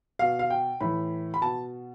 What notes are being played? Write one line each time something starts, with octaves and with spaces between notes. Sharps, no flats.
B2 F5
F5
G5
A2 E3 B5
B5
B2 A5